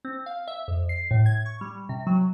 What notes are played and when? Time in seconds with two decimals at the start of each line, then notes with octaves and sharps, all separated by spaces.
0.05 C4
0.26 F5
0.48 E5
0.68 F2
0.89 C7
1.11 A2
1.26 G#6
1.46 C#6
1.61 G3
1.89 C3
2.07 F#3